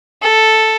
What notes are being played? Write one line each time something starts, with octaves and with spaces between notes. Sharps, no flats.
A4